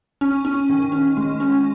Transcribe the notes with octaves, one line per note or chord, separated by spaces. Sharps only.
C#4
C#4
D#3
C#4
G#3
C#4